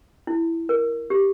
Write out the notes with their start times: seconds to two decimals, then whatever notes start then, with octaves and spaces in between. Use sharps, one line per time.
0.27 E4
0.69 A#4
1.10 G4